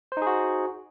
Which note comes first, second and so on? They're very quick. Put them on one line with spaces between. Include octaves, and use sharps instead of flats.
C5 D#4 G#4 F#4